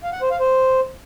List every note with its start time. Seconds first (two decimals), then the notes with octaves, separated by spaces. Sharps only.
0.04 F5
0.13 F#5
0.22 C5
0.31 F5
0.40 C5